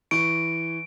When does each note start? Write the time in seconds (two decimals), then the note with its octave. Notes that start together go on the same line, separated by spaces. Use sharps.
0.11 E3 C#6 D7